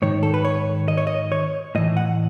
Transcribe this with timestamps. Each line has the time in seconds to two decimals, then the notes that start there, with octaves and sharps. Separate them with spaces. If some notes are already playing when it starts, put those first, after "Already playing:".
0.02 G#2 D#3 C#5
0.23 A4
0.34 B4
0.45 C#5
0.88 D#5
0.97 C#5
1.07 D#5
1.32 C#5
1.75 A2 E3 D#5
1.97 F#5